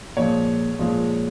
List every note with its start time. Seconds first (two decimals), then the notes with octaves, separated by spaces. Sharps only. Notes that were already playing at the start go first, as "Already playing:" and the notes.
0.17 A#2 F3 G#3 C#5
0.79 A#2 F3 G#3